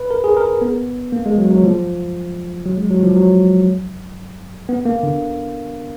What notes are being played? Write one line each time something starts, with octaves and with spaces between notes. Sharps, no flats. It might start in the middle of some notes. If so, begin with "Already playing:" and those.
Already playing: B4
A#4
G#4
A#4
B3
A#3
G#3
F#3
F#3
F3
F#3
G#3
F#3
F3
F#3
B3
A#3
D3